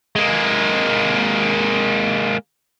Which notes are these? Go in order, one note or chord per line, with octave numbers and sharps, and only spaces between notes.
G#3 A#3